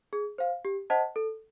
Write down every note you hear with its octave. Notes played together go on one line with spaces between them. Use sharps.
G#4
C5 F5
G4
C5 D#5 F#5 A5
A4